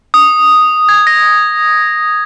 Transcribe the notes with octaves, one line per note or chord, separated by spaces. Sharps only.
D#6
G#6
A#6